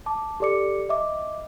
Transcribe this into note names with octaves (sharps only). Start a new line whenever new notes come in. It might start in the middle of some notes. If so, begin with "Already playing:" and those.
A5 D6
G4 A4 D5 D6 C#7
D#5 E5 D6